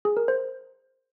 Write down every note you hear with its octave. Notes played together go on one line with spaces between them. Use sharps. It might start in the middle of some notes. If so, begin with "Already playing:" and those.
G#4
A#4
C5